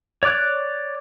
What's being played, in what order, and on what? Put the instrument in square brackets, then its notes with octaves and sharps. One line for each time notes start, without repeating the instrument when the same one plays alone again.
[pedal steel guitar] C#5 D5 D6 F#6